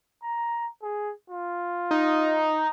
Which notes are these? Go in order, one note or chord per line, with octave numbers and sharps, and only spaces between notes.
A#5
G#4
F4
D#4